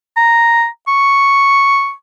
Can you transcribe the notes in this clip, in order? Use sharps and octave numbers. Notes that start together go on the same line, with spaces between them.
A#5
C#6